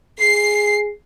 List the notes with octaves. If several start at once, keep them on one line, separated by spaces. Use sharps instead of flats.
G#4 C7